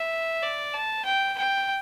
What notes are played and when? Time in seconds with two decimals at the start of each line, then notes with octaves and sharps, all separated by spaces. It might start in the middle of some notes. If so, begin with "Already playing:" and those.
Already playing: E5
0.43 D5
0.74 A5
1.05 G5
1.38 G5